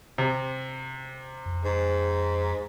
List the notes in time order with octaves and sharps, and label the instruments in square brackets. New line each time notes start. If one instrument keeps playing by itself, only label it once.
[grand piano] C3
[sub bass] F2
[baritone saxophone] G#2